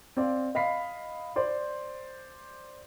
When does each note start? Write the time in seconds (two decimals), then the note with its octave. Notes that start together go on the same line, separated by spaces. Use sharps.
0.17 C4 D5 F5
0.55 D#5 F5 B5 B6 C7
1.36 C5 D5 C6